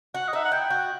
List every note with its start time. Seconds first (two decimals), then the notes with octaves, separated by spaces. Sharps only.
0.15 F#4 F#5
0.28 D#5
0.33 D#4 E5
0.44 F#5
0.52 E4 G5
0.70 F#4